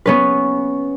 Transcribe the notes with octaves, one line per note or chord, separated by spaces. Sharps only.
B3 C#4 B4